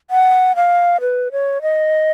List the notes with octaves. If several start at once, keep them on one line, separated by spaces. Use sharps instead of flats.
F#5
F5
B4
C#5
D#5